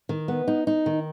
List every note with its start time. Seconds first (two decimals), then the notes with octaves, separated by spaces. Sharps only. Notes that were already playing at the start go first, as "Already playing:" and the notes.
0.09 D#3
0.28 B3
0.48 D#4
0.67 D#4
0.86 D#3